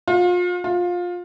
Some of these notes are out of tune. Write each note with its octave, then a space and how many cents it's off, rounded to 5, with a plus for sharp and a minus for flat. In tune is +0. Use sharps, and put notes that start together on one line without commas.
F4 +35
F4 +20